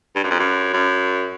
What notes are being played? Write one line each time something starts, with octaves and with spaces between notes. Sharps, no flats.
G2
F#2
F2
F#2
F#2